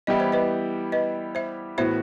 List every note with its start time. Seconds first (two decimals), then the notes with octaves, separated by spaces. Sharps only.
0.07 E3 G3 B3 E4 G4 D#5
0.20 C5
0.32 B4 D#5
0.92 B4 D#5
1.35 C5 E5
1.78 A2 E3 B3 F#4 C5 E5